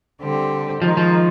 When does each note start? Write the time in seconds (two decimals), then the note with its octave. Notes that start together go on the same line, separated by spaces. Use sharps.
0.21 D3 G3 C4 G4
0.82 D#3 F3 G#3 D#4
0.97 F3